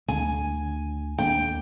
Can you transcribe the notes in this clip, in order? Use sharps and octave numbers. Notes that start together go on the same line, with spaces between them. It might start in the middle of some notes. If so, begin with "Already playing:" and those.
D2 D3 G#5
D#2 A#3 D4 G5